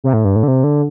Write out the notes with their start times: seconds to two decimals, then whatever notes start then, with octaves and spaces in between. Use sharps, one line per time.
0.04 C3
0.13 A2
0.25 G2
0.36 A2
0.43 D3
0.48 C3
0.64 D3